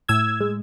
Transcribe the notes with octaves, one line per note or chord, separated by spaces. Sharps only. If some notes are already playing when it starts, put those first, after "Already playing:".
A2 E6 G#6
G#3